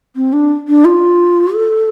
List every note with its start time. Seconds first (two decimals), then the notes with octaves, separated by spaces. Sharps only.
0.16 C4
0.33 D4
0.68 D4
0.85 F4
1.54 A4